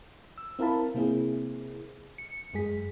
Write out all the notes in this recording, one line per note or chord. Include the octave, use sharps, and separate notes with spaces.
E6
C4 E4 A#4 F5 A5 B5
C3 A#3 C4 E4 G#4
C#7
F#2 G#3 G#4 B6